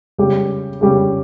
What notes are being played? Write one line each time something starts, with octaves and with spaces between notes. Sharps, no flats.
C#3 G3 C#4 G4
C#3 G3 C#4 G4